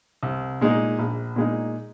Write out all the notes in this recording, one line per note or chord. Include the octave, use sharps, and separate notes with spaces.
C2
A#2 G#3 D#4
A#1
A#2 G#3 D#4